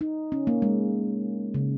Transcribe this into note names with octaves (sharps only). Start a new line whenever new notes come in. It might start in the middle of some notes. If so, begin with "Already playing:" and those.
D#4
C#4
A#3
G#3
C#3